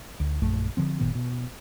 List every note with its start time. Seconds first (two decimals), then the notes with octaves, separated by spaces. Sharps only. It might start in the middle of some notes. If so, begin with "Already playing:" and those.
0.20 D2
0.42 A#1 F#2 A3
0.77 D3 F3 C4
1.00 F#1 A#2 D#3 B3
1.15 B2